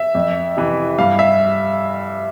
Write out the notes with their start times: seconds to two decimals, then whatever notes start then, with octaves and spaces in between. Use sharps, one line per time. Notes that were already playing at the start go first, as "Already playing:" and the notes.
Already playing: E5
0.15 F2
0.57 C3 E3
0.99 G2 F5
1.19 E5